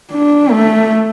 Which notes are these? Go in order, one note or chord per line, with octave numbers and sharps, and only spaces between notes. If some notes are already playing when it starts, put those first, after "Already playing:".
D4
A3